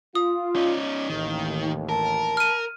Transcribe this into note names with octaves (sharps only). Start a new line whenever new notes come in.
F4 D#6
C#4 D#4
A1 D#2 D#3
A#4 A5
F6 D#7